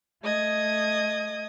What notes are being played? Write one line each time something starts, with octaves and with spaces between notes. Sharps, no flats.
A3 D#5 D#6 G#6